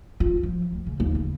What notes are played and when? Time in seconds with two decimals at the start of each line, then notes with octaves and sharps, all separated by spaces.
0.20 F4
0.43 F3
0.72 D2
0.86 C#3
1.00 D#2
1.15 C#3